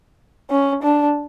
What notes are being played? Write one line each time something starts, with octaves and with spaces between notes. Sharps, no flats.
C#4
D4